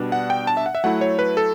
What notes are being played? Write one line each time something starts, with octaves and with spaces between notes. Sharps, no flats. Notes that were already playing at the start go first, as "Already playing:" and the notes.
Already playing: B2 G3 B3 D4
F#5
G5
A5
E5
F#5
E5
F#3 A3 E4 F#5
C#5
B4
A4